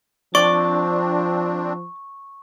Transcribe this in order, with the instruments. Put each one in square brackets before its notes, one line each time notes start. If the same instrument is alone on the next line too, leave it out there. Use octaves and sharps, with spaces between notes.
[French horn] F3 [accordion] C4 D4 [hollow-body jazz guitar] D5 [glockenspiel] C#6